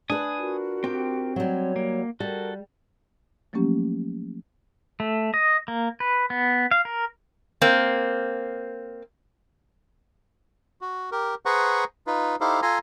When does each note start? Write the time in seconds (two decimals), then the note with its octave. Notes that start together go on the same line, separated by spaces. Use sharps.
0.10 D4 B4 G#5 D#6
0.38 F4 F#4 A#4
0.84 C4 G4 G5
1.36 F#3 G3 C#5
1.76 A#3
2.20 G3 F#4 A4 A#4
3.53 F3 F#3 A3 A#3 C#4 G4
5.00 A3
5.34 D#5
5.68 A#3
6.00 B4
6.30 B3
6.71 F5
6.85 A#4
7.62 A#3 C4
10.81 F#4
11.12 G4 A#4
11.46 G#4 B4 C5 F#5 A#5 C#6
12.07 D#4 F4 B4
12.41 D#4 E4 G4 A4 C5 F5
12.62 F4 A4 G#5 A#5 C6